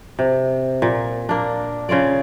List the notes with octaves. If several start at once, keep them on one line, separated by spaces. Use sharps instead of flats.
C3
A#2
A#3 D4
C#3 F4 C#5 D5